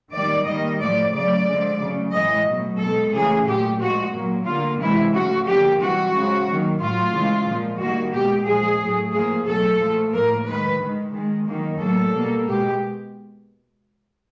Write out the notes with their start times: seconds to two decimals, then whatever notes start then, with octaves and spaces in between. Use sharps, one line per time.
0.14 D#3 G3 A#3 D5
0.47 D#3 G3 A#3 D#5
0.81 A2 F3 A3 D5
1.14 C#3 F#3 A3 D5
1.47 D3 F3 G#3
1.81 C#3 F#3 A3
2.14 A2 E3 G#3 D#5
2.47 B2 F#3 A3
2.80 B2 G#3 A4
3.14 C#3 E3 A3 G#4
3.47 A#2 F#3 A3 G4
3.80 A#2 F3 G#3 F#4
4.13 A#2 F#3 A#3
4.47 D3 G3 A#3 F4
4.80 C3 E3 G#3 E4
5.14 C#3 F3 A3 F#4
5.47 D3 F3 A#3 G4
5.80 C3 E3 G3 F#4
6.14 C#3 F3 G#3
6.47 D#3 F#3 A#3
6.81 A2 F#3 A3 F4
7.14 C#3 E3 G#3
7.47 A#2 F3 G#3
7.81 D#3 G3 A#3 F#4
8.14 B2 G#3 G4
8.47 A#2 F3 G#3 G#4
8.81 A2 F#3 A3
9.13 A2 F3 A#3 G#4
9.47 B2 F#3 A3 A4
9.81 A#2 F3 A3
10.13 A2 F3 A#3 A#4
10.47 D#3 G#3 B4
10.80 D#3 G#3
11.13 D#3 G#3
11.47 D#3 F#3 A#3
11.80 A2 F#3 A#3 A4
12.13 B2 G3 A#3
12.47 B2 G#3 G4